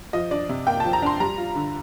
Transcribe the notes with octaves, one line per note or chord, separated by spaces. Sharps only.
F3 D#5
D4 D5
C3
A#3 G5
F3 A5
A#5
D4 C6
G3 A#5
F4
D3